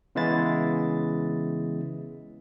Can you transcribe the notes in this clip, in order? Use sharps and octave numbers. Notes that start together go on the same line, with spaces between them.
C#3 E3 G#3 B3 E4 A6